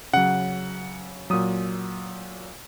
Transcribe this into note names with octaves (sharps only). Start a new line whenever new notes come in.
C#3 F#3 F#5
A#2 F#3 D#6